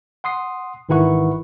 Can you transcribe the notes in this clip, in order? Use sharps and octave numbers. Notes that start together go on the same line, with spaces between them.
F#5 C6 D#6 C7
G#1 D#3 E3 E4 F#5 C#6